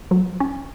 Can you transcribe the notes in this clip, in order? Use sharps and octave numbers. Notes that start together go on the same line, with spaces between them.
F#3
C#4